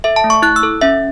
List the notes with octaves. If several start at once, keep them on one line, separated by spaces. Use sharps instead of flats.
A4 E5
A5
A3
C#6
E4 F#6
E6
A4
C#4 E5